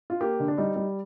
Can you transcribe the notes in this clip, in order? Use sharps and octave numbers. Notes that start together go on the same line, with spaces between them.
F4
A#3 G4
D3
D4
G3 D#4
G3